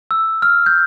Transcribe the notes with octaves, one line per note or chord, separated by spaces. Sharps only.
E6
F6
G6